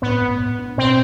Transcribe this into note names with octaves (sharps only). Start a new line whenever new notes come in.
A2 B3
A2
A2
D4
B2 C4